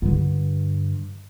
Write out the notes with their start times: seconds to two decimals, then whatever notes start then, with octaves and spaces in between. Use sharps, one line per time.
0.02 G2 D3